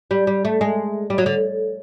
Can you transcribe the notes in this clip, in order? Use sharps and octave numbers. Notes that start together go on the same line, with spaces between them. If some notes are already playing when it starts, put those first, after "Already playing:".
G3
G3
A3
G#3
G3
F#3
D3